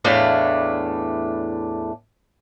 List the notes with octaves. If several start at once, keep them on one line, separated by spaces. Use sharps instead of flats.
E2 A2 A3 D4 D5 F5